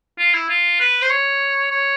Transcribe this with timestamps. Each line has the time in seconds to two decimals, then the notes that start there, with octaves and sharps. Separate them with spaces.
0.19 F4
0.34 E4
0.49 F4
0.80 B4
1.02 C5
1.10 C#5
1.71 C#5